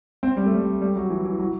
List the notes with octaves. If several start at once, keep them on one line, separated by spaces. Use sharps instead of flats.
C4
G3
A3
G3
G3
F#3
E3
E3
F#3